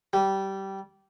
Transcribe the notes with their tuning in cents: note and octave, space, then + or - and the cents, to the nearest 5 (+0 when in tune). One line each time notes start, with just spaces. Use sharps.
G3 -15